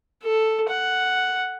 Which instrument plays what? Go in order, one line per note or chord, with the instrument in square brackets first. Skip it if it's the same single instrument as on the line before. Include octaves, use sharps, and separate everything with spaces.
[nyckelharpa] A4
F#5